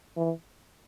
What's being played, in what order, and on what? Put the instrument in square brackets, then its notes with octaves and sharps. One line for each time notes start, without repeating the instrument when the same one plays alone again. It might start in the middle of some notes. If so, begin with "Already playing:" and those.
[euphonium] E3